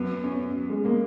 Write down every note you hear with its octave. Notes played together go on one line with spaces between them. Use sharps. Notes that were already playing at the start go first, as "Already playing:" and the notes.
Already playing: F#2 B3
C#4
F#2
G#3
A#3